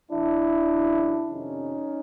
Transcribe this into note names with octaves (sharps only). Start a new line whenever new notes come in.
A2 E3 D4 E4
F#2 C#3 E3
F2 C3 D#3 C#4 D#4